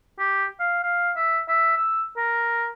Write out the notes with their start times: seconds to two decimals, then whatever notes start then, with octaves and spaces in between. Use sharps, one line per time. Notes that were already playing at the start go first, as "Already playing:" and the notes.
0.19 G4
0.60 F5
0.83 F5
1.16 E5
1.48 E5
1.77 E6
2.16 A#4